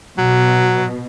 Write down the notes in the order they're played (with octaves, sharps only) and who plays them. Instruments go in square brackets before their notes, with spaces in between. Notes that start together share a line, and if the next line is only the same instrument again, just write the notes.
[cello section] B2 [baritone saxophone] F#3